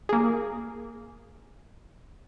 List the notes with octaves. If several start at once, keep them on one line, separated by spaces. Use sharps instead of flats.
A#3 G#4